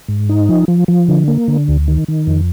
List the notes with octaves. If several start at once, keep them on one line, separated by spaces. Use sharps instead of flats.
G#2
D#4
F3
F3
F3
D3
A#3
D3
D2
D#3
D#3
F2